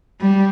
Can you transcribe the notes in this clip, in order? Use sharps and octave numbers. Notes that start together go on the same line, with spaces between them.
G3